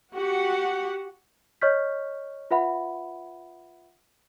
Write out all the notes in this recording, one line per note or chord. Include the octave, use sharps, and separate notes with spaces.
F#4 G4 F#5
C#5 D#5 C#6 F6 G6 B6
F4 B4 E5 F#5 B5